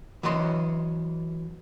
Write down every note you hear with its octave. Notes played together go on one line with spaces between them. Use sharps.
E3 F#3 D#5 C6